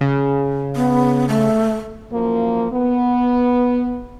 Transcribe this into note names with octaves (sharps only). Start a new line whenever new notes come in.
C#3
B3
A3
F#2 F3 A#3
B3